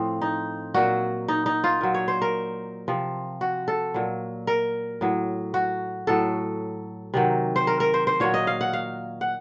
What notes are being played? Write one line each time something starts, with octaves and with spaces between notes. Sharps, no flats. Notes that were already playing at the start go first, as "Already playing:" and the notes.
Already playing: A2 F3 C4
D#4
A#2 F#3 F#4
D#4
D#4
F4
A#2 F#3
C#5
C5
A#4
C3 F3
F#4
A4
A#2 F#3
A#4
A2 F#3
F#4
A2 F#3 A4
C3 D#3 F#3
C5
A#4
A#4
C5
C5
A#2 F#3 C#5
D#5
F5
F#5
F5
F#5